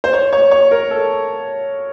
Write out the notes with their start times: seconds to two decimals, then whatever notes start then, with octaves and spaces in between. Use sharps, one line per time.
0.04 C5
0.13 C#5
0.33 C#5
0.51 C#5
0.71 A#4
0.91 A4